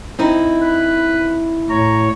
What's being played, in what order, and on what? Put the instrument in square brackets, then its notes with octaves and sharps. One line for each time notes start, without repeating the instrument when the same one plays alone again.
[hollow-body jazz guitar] C4 D#4 E4
[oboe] B4
[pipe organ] A2 C#5 [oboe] A#5